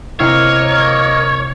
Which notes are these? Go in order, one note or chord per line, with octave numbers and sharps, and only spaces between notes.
C3 A#3 E4 A#4 C#5 D#5 F6 C7